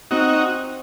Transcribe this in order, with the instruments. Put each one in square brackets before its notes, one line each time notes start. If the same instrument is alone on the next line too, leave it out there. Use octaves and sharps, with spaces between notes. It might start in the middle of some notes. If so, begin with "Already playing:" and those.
[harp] C4 [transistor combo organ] D#4 F#4